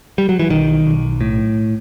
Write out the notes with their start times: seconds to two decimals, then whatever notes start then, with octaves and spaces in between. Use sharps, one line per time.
0.18 G3
0.29 F#3
0.39 E3
0.50 B1 D#3
0.86 B1
1.21 A2